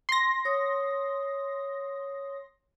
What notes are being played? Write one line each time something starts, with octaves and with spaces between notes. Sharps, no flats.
C6 A#6
C#5 D#6